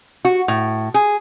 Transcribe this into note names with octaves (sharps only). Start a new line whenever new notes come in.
F#4
A2
G#4